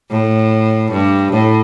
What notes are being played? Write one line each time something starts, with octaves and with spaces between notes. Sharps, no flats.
A2
G2
A2